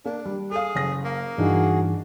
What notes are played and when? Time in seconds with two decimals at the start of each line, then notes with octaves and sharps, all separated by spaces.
0.05 A#3 D4
0.26 G3
0.51 G#4 A4 F5
0.75 F#1 C#4 A#6
1.04 A#3
1.38 G2 E3 D4 D#4 F#4 G#4